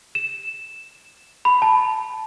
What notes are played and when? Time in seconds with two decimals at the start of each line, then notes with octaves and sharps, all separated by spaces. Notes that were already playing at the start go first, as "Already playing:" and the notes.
0.15 E7
1.45 B5
1.62 A5